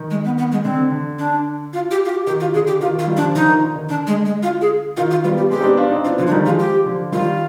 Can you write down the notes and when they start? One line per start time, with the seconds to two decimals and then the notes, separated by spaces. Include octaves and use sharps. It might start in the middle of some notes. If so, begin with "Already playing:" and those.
Already playing: D#3
0.11 G#3
0.25 B3
0.38 B3
0.52 G#3
0.65 D3 C4
0.92 D3
1.19 D4
1.73 F4
1.91 G4
2.05 F4
2.09 G4
2.27 D#3 G4
2.40 F4
2.53 D3 G#4
2.67 G4
2.80 D#3 F4
2.95 D#3 F4
3.07 D#3 G3
3.17 D4
3.21 D3 F3
3.35 D3 F3 D#4
3.49 D#3
3.62 D3
3.76 D#3
3.89 D3 D4
4.07 G#3
4.26 G#3
4.43 F4
4.61 G#4
4.97 D#3 F4
5.11 F4
5.24 G3 B3 F4
5.37 G4
5.50 G#3 C4 G4
5.61 D#4
5.64 B3 D4
5.77 D4 F4
5.91 C4 D#4
6.05 B3 D4 F4
6.18 D3 F3 F4
6.27 D4
6.31 D#3 G3 D#4
6.45 F3 G#3 F4
6.59 G4
6.86 D3 F3
7.12 D#3 G3 F4